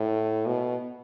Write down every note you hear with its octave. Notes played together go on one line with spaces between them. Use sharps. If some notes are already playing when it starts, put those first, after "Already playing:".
Already playing: A2
B2